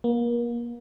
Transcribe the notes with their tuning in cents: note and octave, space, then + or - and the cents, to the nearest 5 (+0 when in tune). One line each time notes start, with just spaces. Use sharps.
A#3 +35